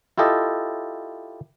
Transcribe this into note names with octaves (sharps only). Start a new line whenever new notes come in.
E4 F4 G4 A4 D#5